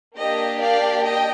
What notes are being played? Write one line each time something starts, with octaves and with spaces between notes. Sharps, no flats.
A#3 D4 G4 D#5
D5 F5
D#5 G5